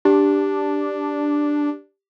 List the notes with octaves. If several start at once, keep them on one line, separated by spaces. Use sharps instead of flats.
D4 G4